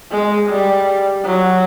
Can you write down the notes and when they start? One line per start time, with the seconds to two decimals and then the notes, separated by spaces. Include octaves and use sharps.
0.11 G#3
0.50 G3
1.26 F#3